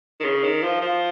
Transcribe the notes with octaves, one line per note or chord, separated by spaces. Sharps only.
D#3
C#3
D#3
F3
F3